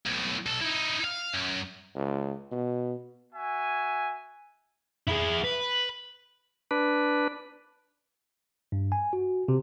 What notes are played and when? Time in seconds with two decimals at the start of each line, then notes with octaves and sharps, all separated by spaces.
0.06 B1 A2
0.46 B1 A4
0.61 D#4 E4
1.04 F5
1.34 F#2
1.95 C#2
2.51 B2
3.33 F#4 E5 G#5
5.08 E4 G#4
5.44 B4
6.71 D4 B4
8.72 G2
8.92 G#5
9.13 F#4
9.48 C3